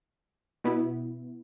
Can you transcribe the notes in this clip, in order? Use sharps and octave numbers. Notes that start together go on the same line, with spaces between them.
B2 B3 E4